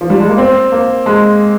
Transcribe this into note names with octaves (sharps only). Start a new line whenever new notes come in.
F3
G3
G#3
A#3
C4
A#3
G#3